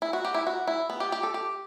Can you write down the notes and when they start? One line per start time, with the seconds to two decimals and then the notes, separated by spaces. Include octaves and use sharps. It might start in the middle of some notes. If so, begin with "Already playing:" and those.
0.02 E4
0.13 F#4
0.25 G4
0.34 E4
0.47 F#4
0.67 E4
0.90 B3
1.00 G4
1.12 G4
1.23 A4
1.34 G4